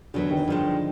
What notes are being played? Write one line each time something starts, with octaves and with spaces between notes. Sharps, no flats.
E2 B2 D3 F#3 B3
D#3
G2 D#3 F3 G#3